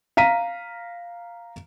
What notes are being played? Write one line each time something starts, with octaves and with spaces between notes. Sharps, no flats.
F5 A#5 B6 D#7